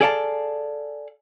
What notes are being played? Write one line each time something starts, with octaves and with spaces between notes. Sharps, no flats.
G#4 A4 D5 F5 F#5 A5